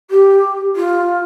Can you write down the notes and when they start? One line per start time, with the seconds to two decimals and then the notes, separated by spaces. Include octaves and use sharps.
0.10 G4
0.76 F4